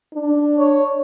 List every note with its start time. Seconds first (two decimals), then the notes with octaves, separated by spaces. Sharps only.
0.14 D4
0.58 C#5